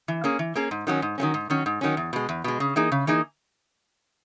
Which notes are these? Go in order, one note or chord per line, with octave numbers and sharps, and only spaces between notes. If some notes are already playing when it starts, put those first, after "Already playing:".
E3
A#3 C#4 G#4
E3
A#3 C#4 G#4
G#2
D#3 F#3 A#3 C#4
G#2
D#3 F#3 A#3 C#4
G#2
D#3 F#3 C#4
G#2
D#3 F#3 C#4
E2
B2 G#3
E2
B2 G#3
C#3
E3 A#3 D#4 G#4
C#3
E3 A#3 D#4 G#4